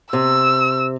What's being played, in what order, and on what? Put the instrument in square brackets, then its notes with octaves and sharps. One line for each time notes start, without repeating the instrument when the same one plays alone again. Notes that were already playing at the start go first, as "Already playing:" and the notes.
[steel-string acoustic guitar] C3 [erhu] E6